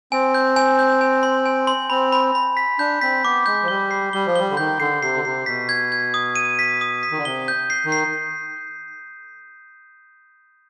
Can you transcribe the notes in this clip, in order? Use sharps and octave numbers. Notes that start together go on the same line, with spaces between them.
C4 G#5
G6
G#5
G6
G#5
C6
G#5
C6
C4 B5
B5
B5
B6
D4 G6
C4 B6
B3 D6
G#3 G6
F3
G3 G7
C7
G3 G7
F3
G3 G7
D3
D#3 G6
D3 C7
C3 C7
D3
C3 C7
B2 B6
G#6
G#6
D#6
D#7
B6
D#6
B6
D#3
D3
C3 G7
G6
C7
D#3
C7